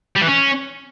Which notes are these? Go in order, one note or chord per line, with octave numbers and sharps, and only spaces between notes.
G3
E3
C#4